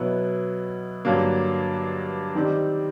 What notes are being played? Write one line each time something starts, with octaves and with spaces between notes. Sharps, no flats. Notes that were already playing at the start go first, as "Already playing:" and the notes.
Already playing: B2 F#3 B3 E4
G2 D3 F#3 A#3
D#3 G3 C4